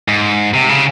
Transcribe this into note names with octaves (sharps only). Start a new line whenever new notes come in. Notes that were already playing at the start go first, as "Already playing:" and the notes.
G#2
C3
C#3